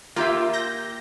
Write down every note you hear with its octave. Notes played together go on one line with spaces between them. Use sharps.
A#3 F4 G4 E5
G6 A#6